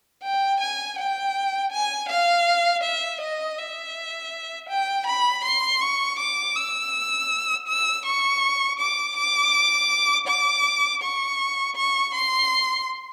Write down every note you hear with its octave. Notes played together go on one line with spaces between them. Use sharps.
G5
G#5
G5
G#5
F5
E5
D#5
E5
G5
B5
C6
C#6
D6
E6
E6
C#6
D6
D6
D6
C#6
C#6
C6